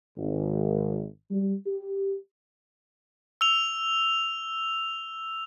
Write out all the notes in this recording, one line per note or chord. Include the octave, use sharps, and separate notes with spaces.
G#1
G3
G4
E6 F7